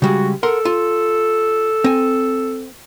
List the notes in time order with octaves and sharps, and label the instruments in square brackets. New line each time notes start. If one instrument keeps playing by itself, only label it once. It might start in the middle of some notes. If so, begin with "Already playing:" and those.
[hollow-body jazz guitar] C#3 G3 G#3 [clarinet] F#4
[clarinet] A4 [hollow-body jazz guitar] A#4 F#5 C6
[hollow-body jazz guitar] F4
C4 G#5